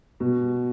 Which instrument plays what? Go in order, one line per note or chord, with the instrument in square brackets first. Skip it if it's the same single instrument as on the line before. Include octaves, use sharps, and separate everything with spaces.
[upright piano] B2